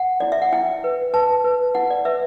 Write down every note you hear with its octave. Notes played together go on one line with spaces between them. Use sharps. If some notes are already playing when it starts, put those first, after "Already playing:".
Already playing: F#5
E4 D5
E5
F#5
E4 G5
B4
B4 A5
B4
E4 F#5
D5
B4 E5